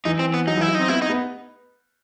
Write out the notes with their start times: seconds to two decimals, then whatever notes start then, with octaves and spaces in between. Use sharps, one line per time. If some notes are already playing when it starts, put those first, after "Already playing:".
0.05 E3 D#4
0.19 C4
0.34 B3
0.47 F#3 D#4
0.57 E3 E4
0.68 F#3
0.75 C4 D#4
0.88 B3 E4
1.02 D#4
1.09 B3